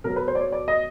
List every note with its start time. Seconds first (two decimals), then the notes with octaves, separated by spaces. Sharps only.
0.04 B2 F#3 A#4
0.16 B4
0.28 C5
0.35 D5
0.40 C#5
0.52 D5
0.68 D#5